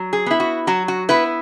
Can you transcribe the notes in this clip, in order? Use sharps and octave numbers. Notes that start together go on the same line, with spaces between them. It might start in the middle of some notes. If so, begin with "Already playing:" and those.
Already playing: F#3
G#4
B3 E4
F#4
F#3 F#4
F#4
B3 E4 B4